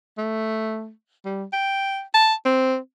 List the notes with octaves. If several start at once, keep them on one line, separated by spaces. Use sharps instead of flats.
A3
G3
G5
A5
C4